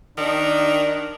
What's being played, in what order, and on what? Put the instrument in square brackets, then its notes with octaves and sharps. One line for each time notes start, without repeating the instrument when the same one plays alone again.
[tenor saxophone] D#3 [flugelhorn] D4